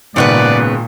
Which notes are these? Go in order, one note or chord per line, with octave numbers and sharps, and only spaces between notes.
G#1 A#2 C#3 B3 B4 D5